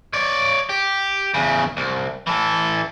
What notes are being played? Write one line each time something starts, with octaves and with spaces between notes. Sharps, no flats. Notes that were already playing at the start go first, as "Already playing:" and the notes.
C#5 D5
G4
E2 C#3
C2
E3 A4